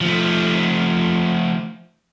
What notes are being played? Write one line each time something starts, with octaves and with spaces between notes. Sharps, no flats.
F3 A3